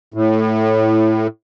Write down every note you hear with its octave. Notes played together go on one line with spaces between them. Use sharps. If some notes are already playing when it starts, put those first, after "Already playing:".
A2